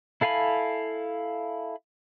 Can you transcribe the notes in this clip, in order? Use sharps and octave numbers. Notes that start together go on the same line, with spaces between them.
E4 A4 F5 G#5 B5